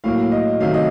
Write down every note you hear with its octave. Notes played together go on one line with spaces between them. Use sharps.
A2 F#3 A#3 F5
D#5
C3 D#3 F#3 A3 F5
D#5